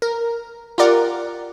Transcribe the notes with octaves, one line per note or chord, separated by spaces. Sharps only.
A#4
F4 G4 A#4 D5 F#5